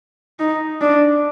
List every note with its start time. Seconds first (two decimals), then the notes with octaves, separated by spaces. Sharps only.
0.39 D#4
0.81 D4